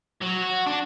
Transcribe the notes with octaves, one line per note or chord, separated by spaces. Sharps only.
F#3
F#4
D4